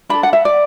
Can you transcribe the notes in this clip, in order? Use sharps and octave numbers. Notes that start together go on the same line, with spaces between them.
D4 A4 B5
F#5
E5
D5